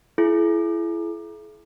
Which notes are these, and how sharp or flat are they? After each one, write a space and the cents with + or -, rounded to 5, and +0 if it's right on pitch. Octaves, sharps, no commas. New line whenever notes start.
E4 +25 G#4 +40